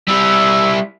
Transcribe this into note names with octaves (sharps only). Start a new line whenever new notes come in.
G3 E4 E6